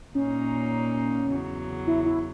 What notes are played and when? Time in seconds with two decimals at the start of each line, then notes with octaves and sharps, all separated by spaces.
0.14 A#2 A#3 C#4 D#4
1.29 E2 C#3 F#3
1.87 E4
2.05 E4